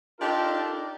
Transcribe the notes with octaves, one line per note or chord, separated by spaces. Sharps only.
D4 D#4 F4 G4 A4 A#4